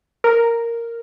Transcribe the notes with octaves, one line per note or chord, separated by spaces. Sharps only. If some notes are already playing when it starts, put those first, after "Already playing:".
A#4